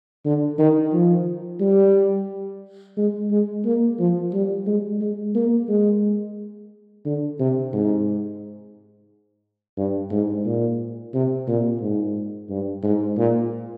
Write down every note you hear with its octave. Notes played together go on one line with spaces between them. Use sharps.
D3
D#3
F3
G3
G#3
G#3
A#3
F3
G3
G#3
G#3
A#3
G#3
D3
C3
G#2
G2
G#2
A#2
C3
A#2
G#2
G2
G#2
A#2